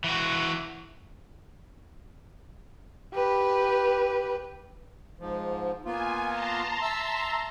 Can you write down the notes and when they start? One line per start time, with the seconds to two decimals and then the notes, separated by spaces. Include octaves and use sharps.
0.04 E3 F#4
3.14 G4 B4
5.20 G#2 F3
5.85 A#3 B3 F4 G#5
6.27 A5 A#5 C6
6.82 E5 E6